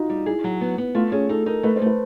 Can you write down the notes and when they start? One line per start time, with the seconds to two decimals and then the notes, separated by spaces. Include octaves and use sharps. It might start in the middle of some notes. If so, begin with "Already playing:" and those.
Already playing: D#4 F4 F#4
0.10 G3
0.26 E4 G#4
0.44 F#3
0.61 B3
0.78 B3
0.95 A3 F4
1.12 C#4 G#4
1.29 D#4 A4
1.46 D#4 A#4
1.63 A3 B4
1.76 C5
1.82 A3 B4